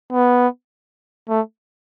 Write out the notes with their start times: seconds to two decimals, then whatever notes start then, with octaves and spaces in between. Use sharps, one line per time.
0.13 B3
1.29 A3